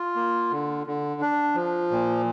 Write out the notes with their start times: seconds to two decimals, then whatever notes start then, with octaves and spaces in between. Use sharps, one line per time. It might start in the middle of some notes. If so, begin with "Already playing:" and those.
Already playing: F4
0.16 A#3
0.51 D3
0.87 D3
1.21 D4
1.55 F3
1.91 A#2